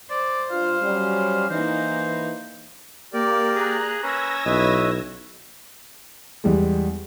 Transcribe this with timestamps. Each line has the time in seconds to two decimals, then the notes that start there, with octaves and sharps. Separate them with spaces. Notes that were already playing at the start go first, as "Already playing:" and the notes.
0.10 C5 D5
0.51 G2 F4 F5
0.82 F#3 G3 C#4
1.50 E3 A#3 D#4 C5
3.13 A#3 G4 A#4 D5
3.55 G#4 A#5 F#6
4.03 C#4 B4 E6 G#6 A#6
4.46 B1 C#4 E4 B4 D#5
6.44 E2 G3 G#3